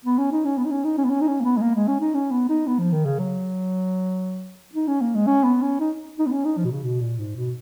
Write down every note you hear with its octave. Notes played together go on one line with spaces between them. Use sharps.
B3
C#4
D#4
C#4
B3
D#4
C#4
D#4
C#4
B3
C#4
D#4
C#4
A#3
B3
G#3
A#3
G#3
C#4
D#4
C#4
B3
D#4
B3
F3
D#3
C#3
F#3
D#4
C#4
A#3
G#3
C#4
B3
C#4
D#4
D#4
B3
C#4
D#4
F3
B2
C#3
B2
A#2
G#2
B2